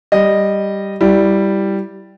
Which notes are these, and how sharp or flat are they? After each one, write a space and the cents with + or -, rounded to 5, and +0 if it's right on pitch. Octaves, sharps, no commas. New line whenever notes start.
G3 +0 D#5 -10
G3 +0 E4 +5